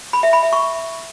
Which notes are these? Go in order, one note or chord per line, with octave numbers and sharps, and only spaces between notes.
B5
E5
B5
E5
C#6